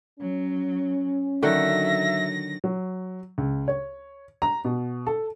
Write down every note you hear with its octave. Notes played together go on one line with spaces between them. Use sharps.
F#3 C#4
D3 D#3 F#3 F#4 E5 A#6
F#3
C#2
C#5
A#5
B2
A4